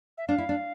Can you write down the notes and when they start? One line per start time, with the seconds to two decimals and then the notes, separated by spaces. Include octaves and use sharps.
0.18 E5
0.28 D4 F5
0.38 E4
0.49 D4